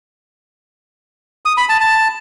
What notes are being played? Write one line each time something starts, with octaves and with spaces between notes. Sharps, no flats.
D#6
B5
A5
A5